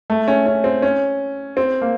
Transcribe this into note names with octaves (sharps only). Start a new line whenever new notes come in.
A3
C#4
C#4
C4
C#4
C4
A#3